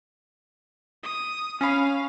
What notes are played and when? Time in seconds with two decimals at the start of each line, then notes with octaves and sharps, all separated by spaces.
1.03 D#6
1.61 C#4 C#5 F5 B5